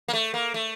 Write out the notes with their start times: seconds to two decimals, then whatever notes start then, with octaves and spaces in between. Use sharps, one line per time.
0.08 A#3
0.13 A3
0.34 A#3
0.54 A3